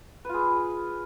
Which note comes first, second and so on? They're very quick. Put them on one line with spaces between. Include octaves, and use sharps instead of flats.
B4 F4 G#4